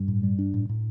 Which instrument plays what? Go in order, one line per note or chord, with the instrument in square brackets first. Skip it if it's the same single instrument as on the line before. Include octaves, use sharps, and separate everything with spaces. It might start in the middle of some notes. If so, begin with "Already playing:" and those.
Already playing: [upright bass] G2
[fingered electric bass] A2
G3
D4
A2
A2